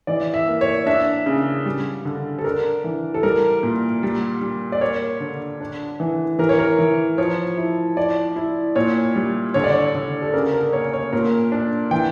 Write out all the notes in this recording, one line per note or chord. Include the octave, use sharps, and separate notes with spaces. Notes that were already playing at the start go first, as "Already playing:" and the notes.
E3 D5
E5
A#3
C#5
D4 E5
C#3
G3
D3
A4
D4 A#4
E3
A4
G3 A#4
A#2
G3
G3
D5
A#3 C#5
D3
D4
E3
E3 A#4
C#5
A#4
E3
F3 C#5
E4
E4 D5
E4
A#2 C#5
G3
D3 C#5
D5
C#5
D3
A4
C#3 A#4
A#4
A#3 C#5
C#5
A#2 A#4
D4
E3 G5